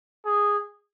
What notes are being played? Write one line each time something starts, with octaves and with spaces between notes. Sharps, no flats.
G#4